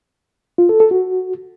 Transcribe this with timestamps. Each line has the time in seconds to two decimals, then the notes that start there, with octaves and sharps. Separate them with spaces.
0.58 F4
0.69 A4
0.80 A4
0.91 F#4